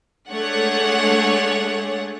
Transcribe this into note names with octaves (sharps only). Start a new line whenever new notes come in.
G#3 A3 D4 G#4 C#5 F#5